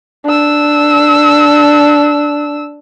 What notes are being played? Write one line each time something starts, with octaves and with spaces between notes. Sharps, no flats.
D4 E6